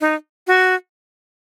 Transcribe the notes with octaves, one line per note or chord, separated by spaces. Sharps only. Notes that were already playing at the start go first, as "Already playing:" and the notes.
D#4
F#4